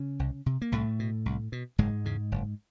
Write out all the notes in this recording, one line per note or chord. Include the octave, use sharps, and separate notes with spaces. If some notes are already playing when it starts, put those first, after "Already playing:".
Already playing: C#3 C#4
C2
C3
A#3
C2 A2 A3
B2
C2
B2
F#1 G#2 G#3
E2 C#3
F#1